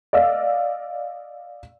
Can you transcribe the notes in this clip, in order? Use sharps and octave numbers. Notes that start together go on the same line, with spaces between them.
D5 D#5 F5 E6